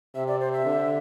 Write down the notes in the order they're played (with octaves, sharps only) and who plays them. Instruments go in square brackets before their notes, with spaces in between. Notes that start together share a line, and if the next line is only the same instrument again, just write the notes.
[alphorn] C3 [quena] E5
[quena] D5
C5
E5
[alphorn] D3